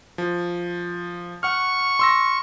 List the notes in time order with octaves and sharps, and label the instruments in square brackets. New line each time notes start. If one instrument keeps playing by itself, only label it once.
[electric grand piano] F3
[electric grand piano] F#5 F6 [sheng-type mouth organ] C#6
[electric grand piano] C6 E6 A#6